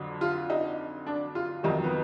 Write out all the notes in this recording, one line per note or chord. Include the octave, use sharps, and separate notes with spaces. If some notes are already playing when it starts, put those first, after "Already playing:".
Already playing: F2 D3 F#3
F4
D#4
D4
F4
F2 D#3 F#3 D#4
B3